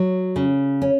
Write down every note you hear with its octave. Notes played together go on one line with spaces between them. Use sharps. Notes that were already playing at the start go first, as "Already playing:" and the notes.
Already playing: F#3
C#3
C#4